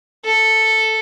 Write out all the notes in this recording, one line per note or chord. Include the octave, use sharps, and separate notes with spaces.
A4